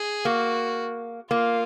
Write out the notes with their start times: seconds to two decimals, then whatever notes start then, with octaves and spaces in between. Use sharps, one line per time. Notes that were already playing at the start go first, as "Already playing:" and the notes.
Already playing: G#4
0.25 A#3 F#4
1.30 A#3 F4